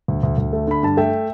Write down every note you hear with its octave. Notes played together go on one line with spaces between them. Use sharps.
D2
D2
D2
A3
D3 B5
G2 A5
A3 E5 G5